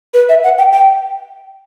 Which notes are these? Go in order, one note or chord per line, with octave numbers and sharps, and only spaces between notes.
B4
E5
F#5
G5
G5